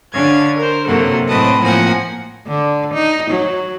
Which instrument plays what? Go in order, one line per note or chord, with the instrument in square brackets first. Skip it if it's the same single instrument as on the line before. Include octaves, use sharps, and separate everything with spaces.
[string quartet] D3 C#4 D4 F5 G#6
A#4 C5
F#2 C3 F#3 A#3 A4 F#5
A2 F#3 C4 B4 D#5 A5
A2 F3 A#3 C4 F#5 G#5
[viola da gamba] D3
D#4
F#3